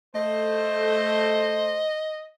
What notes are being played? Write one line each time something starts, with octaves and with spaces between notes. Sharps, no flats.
A3 C5 D#5